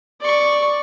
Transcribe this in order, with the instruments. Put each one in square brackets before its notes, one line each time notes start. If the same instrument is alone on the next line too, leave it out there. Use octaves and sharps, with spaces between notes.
[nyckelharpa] D5 C#6